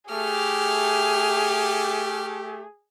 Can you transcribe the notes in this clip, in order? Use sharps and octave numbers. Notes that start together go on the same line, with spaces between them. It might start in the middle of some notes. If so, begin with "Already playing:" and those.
A3 G4 G#4 F6